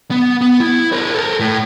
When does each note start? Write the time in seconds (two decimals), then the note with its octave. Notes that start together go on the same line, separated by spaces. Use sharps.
0.11 B3
0.41 B3
0.60 E4
0.92 A#4 C5
1.15 A4 A#4
1.40 A2